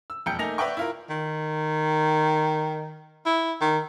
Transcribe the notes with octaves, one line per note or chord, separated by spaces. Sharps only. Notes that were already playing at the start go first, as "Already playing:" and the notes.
E6
E1 F2 G5 G6 C#7
A3 A#3 D#4 G#5 A#6 F7
B4 D5 E5 F#5 G5 C#6
E4 F4 A#4
D#3
E4
D#3